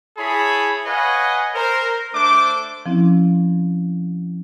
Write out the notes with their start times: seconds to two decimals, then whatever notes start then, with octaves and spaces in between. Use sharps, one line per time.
0.18 E4 G#4 C#5 A5 B5
0.86 B4 C#5 D#5 F5 F#5 G#5
1.55 A#4 C5
2.14 A3 D4 C5 D6
2.86 F3 C4 C#4 E4